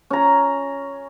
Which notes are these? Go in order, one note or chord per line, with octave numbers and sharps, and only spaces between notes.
C#4 A#5